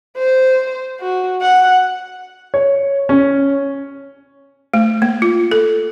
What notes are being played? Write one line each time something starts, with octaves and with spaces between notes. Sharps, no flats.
C5
F#4
F#5
C#5
C#4
A3
A#3
F4
A4